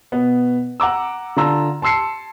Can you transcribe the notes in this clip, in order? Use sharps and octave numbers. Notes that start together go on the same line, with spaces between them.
B2 B3
F#5 A#5 D6 E6
D3 F4 A5 A#5 E6
A5 C6 E6 C7 C#7